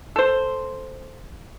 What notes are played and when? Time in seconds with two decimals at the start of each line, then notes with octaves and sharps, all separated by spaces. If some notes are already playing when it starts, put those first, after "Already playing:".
0.16 A4 C5